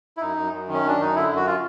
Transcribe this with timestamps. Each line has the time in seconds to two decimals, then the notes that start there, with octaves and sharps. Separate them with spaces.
0.17 E4
0.21 F#2 D#4
0.37 F#2
0.53 F#2
0.68 D#3
0.74 C#4
0.84 F#2 D4
0.99 F#2 D#4
1.15 D3 E4
1.31 F#2
1.36 F#4
1.47 F4